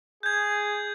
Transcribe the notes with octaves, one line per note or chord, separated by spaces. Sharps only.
G#4 G6 G#6